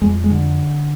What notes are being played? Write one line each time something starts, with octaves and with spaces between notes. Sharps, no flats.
F2 G#3
G#3
D3